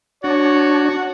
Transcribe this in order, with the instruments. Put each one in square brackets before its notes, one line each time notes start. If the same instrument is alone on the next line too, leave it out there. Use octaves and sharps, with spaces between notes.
[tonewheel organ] D4 [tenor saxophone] F#4 [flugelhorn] C#5